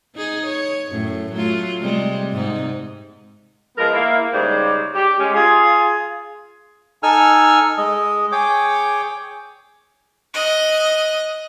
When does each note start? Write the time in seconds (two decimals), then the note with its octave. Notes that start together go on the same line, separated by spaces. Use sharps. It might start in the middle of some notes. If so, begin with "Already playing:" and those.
0.15 D#4 G#4
0.47 C#5
0.91 F#2 A2
1.33 F#3 A3 F4
1.80 C3 G3 G#3
2.32 G#2 C3 D#4
3.78 F3 G#3 B3 A#4
3.93 A#3 E4
4.34 G#2 C#3 G3 C5 D5
4.95 G4
5.20 G#3 C#4
5.34 F4 G#4
7.03 D#4 A4 G#5 E6 F6
7.78 G#3 D#5
8.32 G#4 C#5 G5 D6
10.34 D#5 F#6